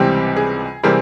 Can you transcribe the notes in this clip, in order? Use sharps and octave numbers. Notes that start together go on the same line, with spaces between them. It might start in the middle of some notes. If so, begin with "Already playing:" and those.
Already playing: C#2 C3 E3 G3 C4 G4
G#4
C3 E3 G3 C4 G#4 A#4